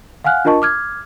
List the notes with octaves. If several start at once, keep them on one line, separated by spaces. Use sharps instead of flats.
F5 F#5 G#5 F6 F#6
D4 F4 A#4 D#5 A5 C#6
D6 F6 G#6